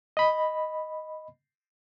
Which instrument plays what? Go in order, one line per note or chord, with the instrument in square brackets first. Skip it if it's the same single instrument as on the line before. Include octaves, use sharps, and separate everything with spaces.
[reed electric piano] D#5 B5